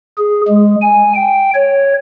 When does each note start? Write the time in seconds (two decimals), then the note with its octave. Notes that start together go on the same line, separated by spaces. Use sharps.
0.18 G#4
0.48 G#3
0.81 G#5
1.15 G5
1.54 C#5